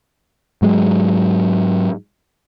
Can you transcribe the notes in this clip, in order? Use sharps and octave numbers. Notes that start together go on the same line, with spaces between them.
G#2 F#3 G#3